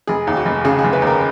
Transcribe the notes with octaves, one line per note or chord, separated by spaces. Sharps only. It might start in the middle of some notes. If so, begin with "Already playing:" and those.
F1 G#4
D#2
F#4
F1
C#3 G#4
G#4
F1
B4
D#2 A#4